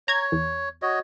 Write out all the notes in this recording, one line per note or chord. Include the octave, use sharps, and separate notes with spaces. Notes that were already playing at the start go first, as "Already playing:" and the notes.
C#5 A#5 G#6
E2
F#4 C#5 D#5